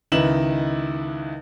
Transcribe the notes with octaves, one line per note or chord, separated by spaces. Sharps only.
C#2 D#3 E4 B4 E7 F#7